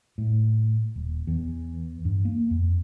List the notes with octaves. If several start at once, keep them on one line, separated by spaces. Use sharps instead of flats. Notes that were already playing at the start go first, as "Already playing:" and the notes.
A2
D#1
E2
G2
A#3
F2